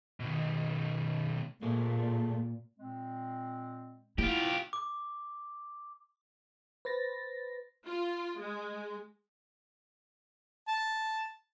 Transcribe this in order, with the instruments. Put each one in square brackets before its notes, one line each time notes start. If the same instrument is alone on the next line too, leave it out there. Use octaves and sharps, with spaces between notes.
[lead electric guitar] B2 D#3
[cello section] A#2 [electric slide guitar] A3 A#3 G#4
[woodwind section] A#2 G#3 C4
[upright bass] E4 [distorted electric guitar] F4 G4
[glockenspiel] D6
[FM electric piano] B4 C5 A6 A#6
[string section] F4
G#3
[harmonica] A5